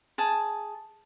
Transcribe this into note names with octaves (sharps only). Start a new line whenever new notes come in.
G#4 A5